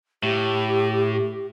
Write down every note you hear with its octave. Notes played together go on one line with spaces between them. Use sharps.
A2 G4